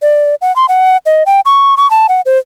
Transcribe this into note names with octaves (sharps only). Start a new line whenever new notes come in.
D5
F#5
C6
F#5
D#5
G5
C#6
C#6
A5
F#5
C5